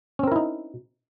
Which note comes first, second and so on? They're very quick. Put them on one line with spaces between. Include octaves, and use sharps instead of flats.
C#4 C4 A#4 E4 D#4